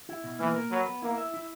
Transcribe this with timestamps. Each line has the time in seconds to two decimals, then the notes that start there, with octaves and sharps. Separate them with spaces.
0.09 E4
0.24 B2
0.40 E3 A#3
0.55 A#4
0.71 F#3 B4
0.86 B3
1.02 A#3 E4
1.18 E5
1.34 E4